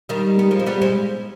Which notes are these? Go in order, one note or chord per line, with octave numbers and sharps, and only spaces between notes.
D#3 G3
B3
F3 G#3
C4
G3 B3
G#3 C4